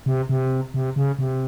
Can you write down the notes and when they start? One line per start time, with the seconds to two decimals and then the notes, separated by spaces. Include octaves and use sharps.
0.06 C3
0.29 C3
0.74 C3
0.96 C#3
1.19 C3